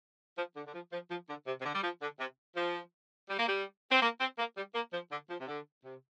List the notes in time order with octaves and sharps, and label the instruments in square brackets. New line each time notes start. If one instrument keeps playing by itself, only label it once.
[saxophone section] F3
D3
D3
F3
F3
F3
D3
C3
C3
D3
G3
F3
D3
C3
F3
G3
A#3
G3
C4
A#3
C4
A#3
G3
A#3
F3
D3
F3
C3
D3
C3